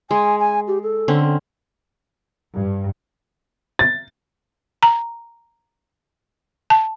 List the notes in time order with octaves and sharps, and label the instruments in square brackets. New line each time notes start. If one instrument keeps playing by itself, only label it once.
[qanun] G#3 [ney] G#5
[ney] G#5
G4
A4
[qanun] D3 C4 C#4
[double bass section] G2
[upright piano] A6
[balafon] A#5
A5